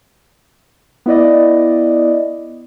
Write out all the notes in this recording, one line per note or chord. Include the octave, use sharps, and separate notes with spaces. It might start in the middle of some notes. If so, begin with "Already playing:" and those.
B3 E4 D5 D#5